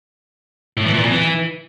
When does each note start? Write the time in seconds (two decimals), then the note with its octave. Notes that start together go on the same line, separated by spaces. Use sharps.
0.77 A2
0.85 E3
0.94 A#2
1.02 F2
1.11 E3